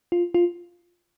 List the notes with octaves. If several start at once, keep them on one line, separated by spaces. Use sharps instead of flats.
F4
F4